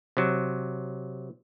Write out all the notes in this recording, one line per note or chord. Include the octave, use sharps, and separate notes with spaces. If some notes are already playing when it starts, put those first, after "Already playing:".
C3 F#3